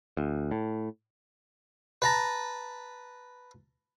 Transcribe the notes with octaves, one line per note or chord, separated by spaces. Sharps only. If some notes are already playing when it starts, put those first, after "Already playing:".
D2
A2
B4 A5 A#5